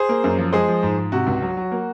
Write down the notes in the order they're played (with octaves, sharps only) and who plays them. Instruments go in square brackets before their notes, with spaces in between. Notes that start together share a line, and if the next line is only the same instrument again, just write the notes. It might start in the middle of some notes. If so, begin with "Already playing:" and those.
Already playing: [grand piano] G#4 C5
A#3
F#2
F3
G#3 G#4 C5
F3
G#2
G#2
C3 F#4
C#2
F#3
F#3
A#3